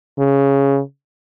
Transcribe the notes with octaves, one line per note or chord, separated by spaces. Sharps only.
C#3